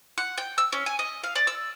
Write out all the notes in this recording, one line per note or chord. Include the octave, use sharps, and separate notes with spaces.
F#5
G5
E6
C#4
G#5
D#5
F5
D5
E6